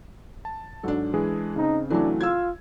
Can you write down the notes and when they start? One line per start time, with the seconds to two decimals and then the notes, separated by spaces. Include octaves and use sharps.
0.45 A5
0.83 G#2 F#3 G#3 D4 A4
1.14 E3 G#3 G#4
1.56 C#3 C4 D#4
1.90 E3 F#3 A3 D4
2.21 F4 E6 G#6